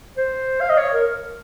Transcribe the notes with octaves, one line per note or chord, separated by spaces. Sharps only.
C5
F5
D#5
C#5
A#4